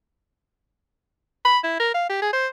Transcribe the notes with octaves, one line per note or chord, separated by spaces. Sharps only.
B5
E4
A#4
F5
G4
G#4
C5